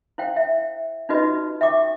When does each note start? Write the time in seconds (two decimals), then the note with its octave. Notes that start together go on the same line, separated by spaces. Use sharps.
0.18 E4 C5 F5 G5
0.36 E5
1.09 D#4 F4 F#4 B4 D#5
1.61 E5 G5 C#6 D6